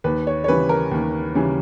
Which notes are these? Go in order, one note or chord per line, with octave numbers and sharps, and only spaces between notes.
D#2 B4
C#5
C#5
C#3 E3 G3 B4
A#4
D#2
C#3 E3 G3